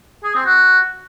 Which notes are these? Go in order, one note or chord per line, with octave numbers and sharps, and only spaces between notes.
G#4
C4
F#4